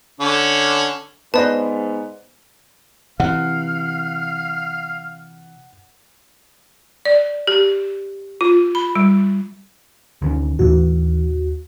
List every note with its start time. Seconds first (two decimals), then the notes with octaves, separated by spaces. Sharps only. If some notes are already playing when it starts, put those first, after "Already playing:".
0.20 D3 C#4
1.34 G#2 B3 B4 C5 D5 D#5 A5
3.20 C3 E3 F5 F#5
7.05 D5
7.47 G4
8.41 F4
8.75 B5
8.95 G3
10.22 D2 D#3 C#4
10.59 D#2 A2 E3 F#4